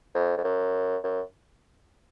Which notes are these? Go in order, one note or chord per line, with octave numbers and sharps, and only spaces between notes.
F2
F2
F#2
F#2